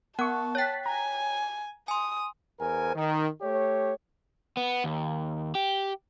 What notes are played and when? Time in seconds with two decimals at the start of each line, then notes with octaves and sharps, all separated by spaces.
0.19 B3 A#4 F#5 A5 C#6 F#6
0.55 C#5 G5 F#6 A6 B6
0.86 G#5 A#5
1.88 G#5 C6 D#6
2.60 E2 A#4 C5 G#5
2.95 D#3
3.42 A3 G4 C#5
4.57 B3
4.84 D#2
5.55 G4